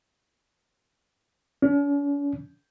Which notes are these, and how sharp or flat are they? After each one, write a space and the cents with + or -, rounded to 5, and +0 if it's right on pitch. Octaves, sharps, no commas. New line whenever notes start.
C#4 +45